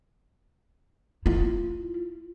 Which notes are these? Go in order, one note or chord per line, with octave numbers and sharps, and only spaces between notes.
E4 F4